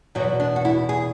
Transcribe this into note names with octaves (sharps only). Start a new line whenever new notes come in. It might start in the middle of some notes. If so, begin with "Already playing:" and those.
E2 B2 F#3
D4
F#4
E4
G#4